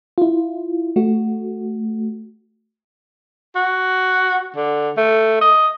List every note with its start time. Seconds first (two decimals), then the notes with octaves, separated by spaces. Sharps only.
0.18 E4 F4
0.96 A3 F#4
3.55 F#4
4.56 D3
4.97 A3
5.41 D#5